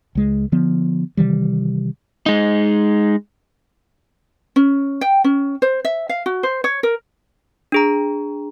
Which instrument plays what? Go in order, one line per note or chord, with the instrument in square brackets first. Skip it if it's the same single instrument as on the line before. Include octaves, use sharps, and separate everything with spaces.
[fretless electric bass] C#2 G#3
D3 F3 B3
C3 D#3 E3 G3
[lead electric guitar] G#3 D#4
[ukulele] C#4
G5
C#4
C5
E5
F5
F#4
C5
C#5
A#4
[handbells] D4 G#4 A#5